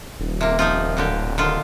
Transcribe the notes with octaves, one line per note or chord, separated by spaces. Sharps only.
D#1
C3 A#3
F3 D#4 F4
D1 A#2 D3 G4
D3 D#3 F4